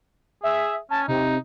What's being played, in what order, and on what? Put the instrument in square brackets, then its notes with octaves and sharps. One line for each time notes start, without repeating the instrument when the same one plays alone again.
[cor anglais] G#4 [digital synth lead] E5
[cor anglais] C#4 [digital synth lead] A5
[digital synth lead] C3 [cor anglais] D#4